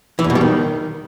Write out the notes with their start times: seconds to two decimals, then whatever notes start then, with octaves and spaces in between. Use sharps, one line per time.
0.19 E3
0.24 E2
0.30 B2
0.35 G3
0.41 D#3